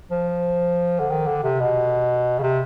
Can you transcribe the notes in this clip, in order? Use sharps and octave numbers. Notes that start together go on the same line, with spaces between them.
F3
D3
D#3
D3
C3
B2
C#3
C3